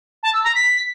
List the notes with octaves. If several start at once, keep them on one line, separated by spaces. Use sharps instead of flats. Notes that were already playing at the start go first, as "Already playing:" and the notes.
A5
E6
A#5
B6